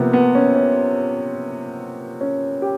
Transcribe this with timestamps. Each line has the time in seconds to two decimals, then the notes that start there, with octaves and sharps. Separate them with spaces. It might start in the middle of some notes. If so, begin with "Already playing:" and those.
Already playing: C3 F3 A#3 B3
0.13 B3
0.35 C#4
0.55 C#4
2.21 C#4
2.62 G4